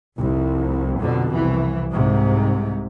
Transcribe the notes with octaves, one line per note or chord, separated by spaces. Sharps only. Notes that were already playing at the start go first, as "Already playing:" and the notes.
F1 C2
B1 F2 B2 D3
C2 E3
C2 G#2 C3